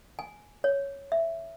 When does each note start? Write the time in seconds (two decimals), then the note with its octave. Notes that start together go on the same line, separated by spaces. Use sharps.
0.19 G#5
0.64 C#5
1.12 E5